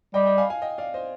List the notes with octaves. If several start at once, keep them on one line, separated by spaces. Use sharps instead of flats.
G3 D#5 G5
D#5 G5
F5 G#5
F5 G#5
D#5 G5
D5 F5
C5 D#5